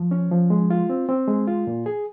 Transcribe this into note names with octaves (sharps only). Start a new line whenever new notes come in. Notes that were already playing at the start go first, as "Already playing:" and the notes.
Already playing: F3
C#4
F3
G#3
F4
C4
C4
G#3
F4
A#2
G#4